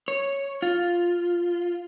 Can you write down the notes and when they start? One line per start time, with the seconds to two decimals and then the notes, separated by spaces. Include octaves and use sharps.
0.08 C#5
0.62 F4